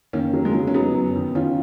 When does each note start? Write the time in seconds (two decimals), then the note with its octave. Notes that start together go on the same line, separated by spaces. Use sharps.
0.13 D#3 A#3 C#4
0.34 F#3
0.45 G#3
0.51 A#3
0.55 F#3
0.60 B3
0.68 C#4
0.74 F#3 B3 D#4
0.94 F#2
1.16 D#3
1.35 D#3 C#4 F4